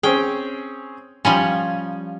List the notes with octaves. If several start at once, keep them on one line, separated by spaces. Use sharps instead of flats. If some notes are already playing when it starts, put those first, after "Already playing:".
C4 C#4 G#4 G5
F3 G3 C#4 G#5